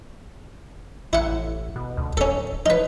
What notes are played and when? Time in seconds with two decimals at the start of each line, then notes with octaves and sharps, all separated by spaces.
1.13 A1 E4 F#5
1.76 B2
1.97 D2
2.17 D1 C#4 A4
2.66 F3 D#4 B4